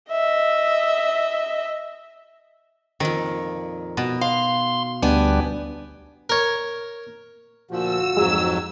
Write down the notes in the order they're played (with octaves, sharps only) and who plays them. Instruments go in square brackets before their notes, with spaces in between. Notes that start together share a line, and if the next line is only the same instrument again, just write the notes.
[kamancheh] D#5 E5
[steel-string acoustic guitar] F2 A#2 [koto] D#3
[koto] B2
[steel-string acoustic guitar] F5 [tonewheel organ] C6
[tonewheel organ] D2 G3 D4 [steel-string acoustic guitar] B3 G#5
[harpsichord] A#4 C#5
[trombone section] D2 F4 F#4 [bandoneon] A#2 F3 [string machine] E6
[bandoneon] F2 G#2 F#3 [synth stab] G#3